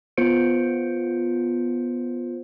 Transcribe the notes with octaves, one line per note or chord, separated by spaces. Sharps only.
B3 F4 C5 C#7 D7